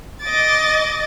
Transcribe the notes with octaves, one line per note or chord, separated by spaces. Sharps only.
D#5 D6 A6